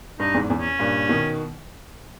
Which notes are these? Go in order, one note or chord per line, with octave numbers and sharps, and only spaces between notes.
G2 D#4
E2 G#2
E2
C#4
G2 A#2
B2 D#3